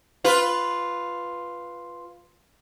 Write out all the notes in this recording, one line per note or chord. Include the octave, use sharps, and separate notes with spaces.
F4 B4